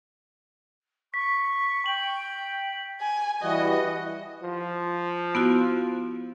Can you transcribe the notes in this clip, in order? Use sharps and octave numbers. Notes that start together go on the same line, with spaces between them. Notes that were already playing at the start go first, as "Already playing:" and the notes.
C#6 B6
G5 F#7
G#5
E3 G3 F#4 D#5
F3
B3 E4 F#4